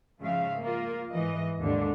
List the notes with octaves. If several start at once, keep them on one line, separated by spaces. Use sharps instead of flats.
G#2 C#3 F3 G#3 E5 F5
A#3 F4 A#4
G#2 E3 D#5
D#2 G#2 D3